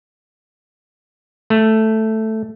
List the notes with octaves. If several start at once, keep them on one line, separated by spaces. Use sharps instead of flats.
A3